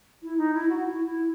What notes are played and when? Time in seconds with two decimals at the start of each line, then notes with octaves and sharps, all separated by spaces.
0.22 E4
0.37 D#4
0.53 E4
0.69 F#4
0.84 E4
1.05 E4